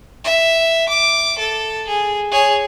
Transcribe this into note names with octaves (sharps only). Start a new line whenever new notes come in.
E5
D6
A4
G#4
G#4 C#5